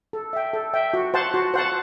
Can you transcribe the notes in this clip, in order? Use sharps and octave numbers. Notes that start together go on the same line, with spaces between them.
A4
E5 G5
A4
E5 G5
F#4
C5 F#5 A5
F#4
C5 F#5 A5